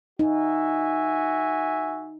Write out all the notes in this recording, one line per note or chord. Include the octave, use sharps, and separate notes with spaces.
D#4 F#4 E5 G#5